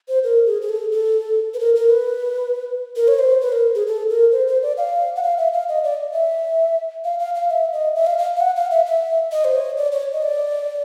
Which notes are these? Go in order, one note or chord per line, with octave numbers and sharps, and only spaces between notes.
C5
A#4
G#4
G#4
A4
A4
B4
A#4
A#4
B4
A#4
C#5
C5
B4
A#4
G#4
A4
A#4
C5
C5
D5
F5
F#5
F5
E5
F5
D#5
D5
E5
F5
F5
F5
E5
D#5
E5
F5
F5
F5
F#5
F5
E5
E5
D#5
C5
C#5
D5
C#5
D#5
D5